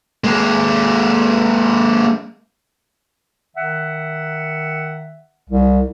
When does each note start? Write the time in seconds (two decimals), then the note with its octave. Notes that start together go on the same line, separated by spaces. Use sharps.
0.24 G#3 A#3
3.55 D#3 E5 F#5
5.50 C2